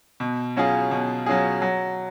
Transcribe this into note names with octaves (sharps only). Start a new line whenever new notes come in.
B2
F#3 C#4 F4 G#4
B2
F#3 C#4 F4 G#4
F#3